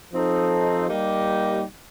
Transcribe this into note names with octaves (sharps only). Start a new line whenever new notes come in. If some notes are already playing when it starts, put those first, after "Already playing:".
F3 C4 D#4 A4
G3 A#3 D#4 G4